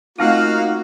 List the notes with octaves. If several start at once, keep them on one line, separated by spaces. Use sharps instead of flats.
A3 A#3 C4 D#4 F4 F#4 F5